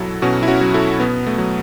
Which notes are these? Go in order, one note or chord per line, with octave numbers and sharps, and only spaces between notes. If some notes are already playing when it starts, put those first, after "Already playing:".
Already playing: B2 F#3 E4 A4
B2 C#4 F#4
E4
C#4 F#4
F#3
E4 A4
B2 B3
A3
F#3